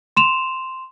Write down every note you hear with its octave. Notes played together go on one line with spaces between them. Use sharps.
C6 E7 F7